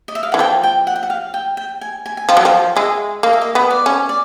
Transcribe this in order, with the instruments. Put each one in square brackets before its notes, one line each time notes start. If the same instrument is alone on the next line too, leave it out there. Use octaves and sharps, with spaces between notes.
[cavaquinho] D#5
E5
F5
[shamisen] E3 [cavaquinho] F#5
[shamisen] F3 [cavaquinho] G5
[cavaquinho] G5
F#5
G5
F#5
F5
G5
G5
G#5
G#5
G#5
[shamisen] F3 [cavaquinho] G5
[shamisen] F#3
F3
[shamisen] G#3 [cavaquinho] E5
[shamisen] A#3 [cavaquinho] D#5
[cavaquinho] E5
D#5
[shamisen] B3
[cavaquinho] D5
[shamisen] C#4
[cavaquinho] D5